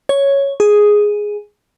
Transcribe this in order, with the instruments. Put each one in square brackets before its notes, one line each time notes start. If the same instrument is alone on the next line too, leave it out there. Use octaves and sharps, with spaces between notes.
[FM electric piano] C#5
G#4